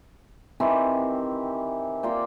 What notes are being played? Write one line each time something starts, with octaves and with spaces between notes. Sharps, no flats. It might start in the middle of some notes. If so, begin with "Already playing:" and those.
D#3 E3 C4 G4
A#3 F4 D5 G5